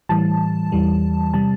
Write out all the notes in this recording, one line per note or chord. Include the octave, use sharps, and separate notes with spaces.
A2 E3 G3 A5
E2 E3 G3
C3 G3 A5